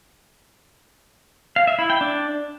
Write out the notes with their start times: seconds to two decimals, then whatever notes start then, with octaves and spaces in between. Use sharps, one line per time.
1.56 F5
1.67 E5
1.79 E4
1.90 G5
2.01 D4